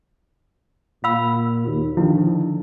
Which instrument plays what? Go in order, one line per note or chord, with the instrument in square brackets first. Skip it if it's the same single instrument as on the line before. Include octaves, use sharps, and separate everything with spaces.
[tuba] A#2 [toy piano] F5 B5 E6
[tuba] D#2
[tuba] D3 [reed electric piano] D#3 F3 [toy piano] E4